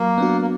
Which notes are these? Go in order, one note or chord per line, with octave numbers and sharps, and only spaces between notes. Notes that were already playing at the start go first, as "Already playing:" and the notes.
Already playing: F#3 A#3
B3 D4 F#4
A#3